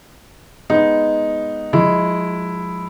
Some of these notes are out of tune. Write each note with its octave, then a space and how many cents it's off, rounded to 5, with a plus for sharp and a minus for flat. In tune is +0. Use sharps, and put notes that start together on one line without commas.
G#3 +0 B3 +0 D#4 +0
F3 +35 G#3 +0 E4 +0